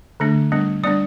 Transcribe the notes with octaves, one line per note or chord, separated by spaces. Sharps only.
D3 A3 D4
G3 B3 D4
G3 B3 D4 D5